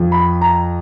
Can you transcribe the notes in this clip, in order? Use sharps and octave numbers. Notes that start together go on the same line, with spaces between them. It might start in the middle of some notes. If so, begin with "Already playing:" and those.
Already playing: F2 F3
B5
A#5